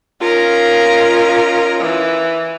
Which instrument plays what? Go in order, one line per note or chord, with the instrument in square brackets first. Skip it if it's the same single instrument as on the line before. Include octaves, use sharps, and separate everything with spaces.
[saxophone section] C#4 D#4 F4 [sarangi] A#4
[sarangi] E3